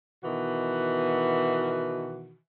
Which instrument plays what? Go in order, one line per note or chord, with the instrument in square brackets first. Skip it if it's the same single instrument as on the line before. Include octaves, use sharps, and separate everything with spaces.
[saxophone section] B2 D#3 E3 F#4